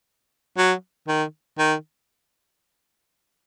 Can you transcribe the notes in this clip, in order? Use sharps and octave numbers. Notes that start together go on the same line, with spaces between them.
F#3
D#3
D#3